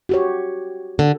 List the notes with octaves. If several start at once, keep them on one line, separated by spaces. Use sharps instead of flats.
F#4 G4 C#5
D3